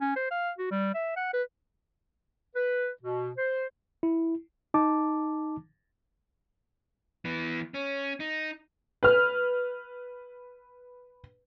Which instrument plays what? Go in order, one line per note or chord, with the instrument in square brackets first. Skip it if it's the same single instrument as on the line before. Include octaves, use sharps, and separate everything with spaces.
[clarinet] C#4
C5
F5
F#4
G3
E5
F#5
B4
[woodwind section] B4
B2
C5
[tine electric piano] E4
[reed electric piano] D#4 A5 D6
[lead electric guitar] E3 B3
C#4
D#4
[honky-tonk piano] B4 F6